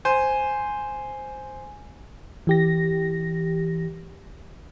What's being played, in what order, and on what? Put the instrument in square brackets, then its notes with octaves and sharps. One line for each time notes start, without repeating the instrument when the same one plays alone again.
[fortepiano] C5 [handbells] G#5
[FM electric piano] E3 G4 A#6